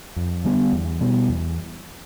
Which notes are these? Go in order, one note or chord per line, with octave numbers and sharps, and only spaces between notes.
F2
D3 G3 B3
E2
B2 G3 B3
E2